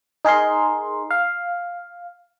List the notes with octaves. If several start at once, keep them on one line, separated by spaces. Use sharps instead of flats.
D#4 G#4 A#4 C6
F5